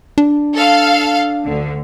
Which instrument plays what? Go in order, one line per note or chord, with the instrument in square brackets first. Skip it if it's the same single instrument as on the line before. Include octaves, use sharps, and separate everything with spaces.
[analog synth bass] D4
[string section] A4 F5
D2 D3